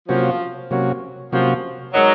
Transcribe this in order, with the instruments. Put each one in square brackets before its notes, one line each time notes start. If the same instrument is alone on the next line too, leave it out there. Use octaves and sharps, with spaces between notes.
[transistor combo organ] C3 F#3 A#3 C#4 F#4 [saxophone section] F3
[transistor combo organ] C3 F#3 A#3 C#4 F#4
[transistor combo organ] C3 F#3 A#3 C#4 F#4 [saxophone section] F3
[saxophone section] F#3 [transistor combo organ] G#3 D#4 A#4 D#5